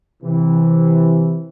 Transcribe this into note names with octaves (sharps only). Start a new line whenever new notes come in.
C3 E3